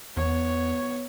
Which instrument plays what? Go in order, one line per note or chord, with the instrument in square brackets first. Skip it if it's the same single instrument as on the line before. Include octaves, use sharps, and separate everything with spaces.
[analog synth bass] E2 [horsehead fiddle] B3 C#5